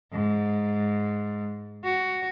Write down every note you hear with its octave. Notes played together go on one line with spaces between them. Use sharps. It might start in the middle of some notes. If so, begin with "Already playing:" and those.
G#2
F#4